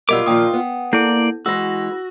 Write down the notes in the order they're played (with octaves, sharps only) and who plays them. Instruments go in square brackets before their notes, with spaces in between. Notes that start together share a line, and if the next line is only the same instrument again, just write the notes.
[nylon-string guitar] F#2 B2 G3 [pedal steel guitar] F4 D6 [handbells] A#4 D#5 E6
[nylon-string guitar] A#2 D#3 F3 [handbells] G5 D#6
[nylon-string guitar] B3
[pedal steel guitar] A#3 D5 [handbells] E4 A4 G6
[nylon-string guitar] E3 G#3 [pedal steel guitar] F#4 [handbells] E6 A#6